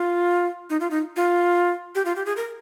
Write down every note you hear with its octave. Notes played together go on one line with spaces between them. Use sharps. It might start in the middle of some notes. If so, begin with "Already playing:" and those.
Already playing: F4
D#4
F4
D#4
F4
G4
F4
G4
G#4
A#4